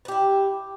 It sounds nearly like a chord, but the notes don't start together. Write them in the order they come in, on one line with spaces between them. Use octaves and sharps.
B4 G4 E4